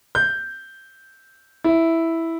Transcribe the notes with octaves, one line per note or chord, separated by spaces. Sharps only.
G6
E4